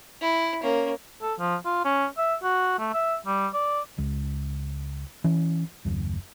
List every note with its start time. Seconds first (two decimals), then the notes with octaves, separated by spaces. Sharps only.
0.21 E4
0.62 A#3 C#4
1.22 A4
1.39 F3
1.65 F4
1.85 C#4
2.18 E5
2.43 F#4
2.79 A3
2.93 E5
3.26 G3
3.53 D5
3.98 C#2
5.24 E3 C#4
5.85 F#1 D#2